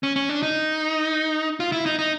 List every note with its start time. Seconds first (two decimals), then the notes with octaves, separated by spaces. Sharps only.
0.03 C#4
0.16 C#4
0.29 D4
0.43 D#4
1.60 F4
1.72 E4
1.86 D#4
1.99 D#4